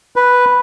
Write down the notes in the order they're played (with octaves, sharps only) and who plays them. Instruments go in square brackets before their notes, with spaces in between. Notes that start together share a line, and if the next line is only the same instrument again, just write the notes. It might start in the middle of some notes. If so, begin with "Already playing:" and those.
[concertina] B4